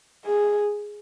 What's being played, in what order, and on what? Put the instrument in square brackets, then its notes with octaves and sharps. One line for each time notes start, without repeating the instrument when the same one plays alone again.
[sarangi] G#4